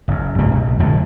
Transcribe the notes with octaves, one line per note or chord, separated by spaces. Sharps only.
F#1 F#2
C2 G#2 C#3 A#3
B1
D1 F#2 A2 A3